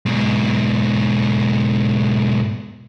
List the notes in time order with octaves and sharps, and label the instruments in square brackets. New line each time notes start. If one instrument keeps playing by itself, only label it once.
[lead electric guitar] G#2 B2